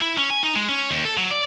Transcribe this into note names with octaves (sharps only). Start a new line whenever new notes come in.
E4
C#4
G#5
D#4
G#3
C#4
D#2
A4
F#3
D5